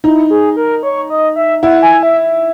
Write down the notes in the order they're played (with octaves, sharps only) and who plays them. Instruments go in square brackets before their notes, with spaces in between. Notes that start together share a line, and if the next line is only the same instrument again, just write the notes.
[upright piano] D#4 [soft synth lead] E4
[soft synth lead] G#4
A#4
C#5
D#5
E5
[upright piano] E4 [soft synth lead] F#5
[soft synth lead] G#5
E5